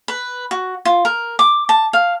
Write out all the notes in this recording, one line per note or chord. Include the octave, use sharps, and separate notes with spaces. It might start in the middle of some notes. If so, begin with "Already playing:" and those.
B4
F#4
F4
A#4
D6
A5
F5